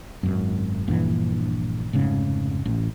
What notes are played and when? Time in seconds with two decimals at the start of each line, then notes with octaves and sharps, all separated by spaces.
0.23 G#1 F#2
0.88 A#1 G2 E3
1.93 F1 G#2 C#3
2.66 A1